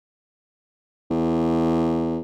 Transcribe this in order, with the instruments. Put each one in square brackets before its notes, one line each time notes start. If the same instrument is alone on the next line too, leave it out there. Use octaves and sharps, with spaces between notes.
[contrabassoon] E2